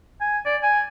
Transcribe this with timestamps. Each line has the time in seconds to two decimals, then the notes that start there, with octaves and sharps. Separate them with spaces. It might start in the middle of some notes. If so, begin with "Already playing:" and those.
0.21 G#5
0.46 D5
0.63 G#5